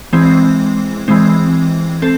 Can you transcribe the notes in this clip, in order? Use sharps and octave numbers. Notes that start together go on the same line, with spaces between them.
E3 G#3 C4
E3 G#3 C4
C4 A4